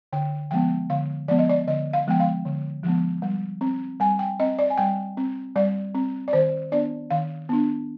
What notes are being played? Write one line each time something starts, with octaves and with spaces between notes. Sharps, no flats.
D3 G5
F3 G#3 B3 G5
D3 F5
F3 G#3 B3 D5
D#5
D5
D3 D#5
F5
F3 G#3 B3 G5
F5
D3
F3 G#3 B3
G3
C4
G3 G#5
G5
C4 D#5
D5
G#5
G3 G5
C4
G3 D5
C4
D5
D#3 C5
B3 D4 D5
D#3 F5
B3 D4